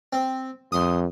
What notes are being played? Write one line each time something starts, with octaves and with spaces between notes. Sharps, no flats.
C4
F2 C6 D#6